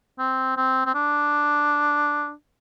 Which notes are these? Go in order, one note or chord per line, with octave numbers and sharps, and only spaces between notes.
C4
C4
C4
D4